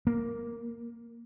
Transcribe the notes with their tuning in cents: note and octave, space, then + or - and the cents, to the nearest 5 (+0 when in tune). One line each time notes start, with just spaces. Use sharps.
A#3 +0